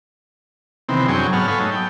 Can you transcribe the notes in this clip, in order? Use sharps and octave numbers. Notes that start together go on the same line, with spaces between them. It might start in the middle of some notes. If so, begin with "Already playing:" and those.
C3 D#3 E3 B3 C4
F#2 D3 F#3 G#4 G5 C#6
G#2 B3 C#5 F#5 A5 F6
A4 B4 C#5 F5 G#5
F#3 A3 D#4
G5